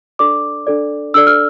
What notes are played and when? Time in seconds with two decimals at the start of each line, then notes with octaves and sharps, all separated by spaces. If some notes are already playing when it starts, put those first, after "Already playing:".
0.19 D4 A4 D5 D6
0.67 D4 A4 D5
1.14 D4 A4 D5 E6
1.27 F6